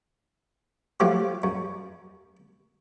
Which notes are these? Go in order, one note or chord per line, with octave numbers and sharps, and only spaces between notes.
F3 F#3 A3 F4 G4
F#2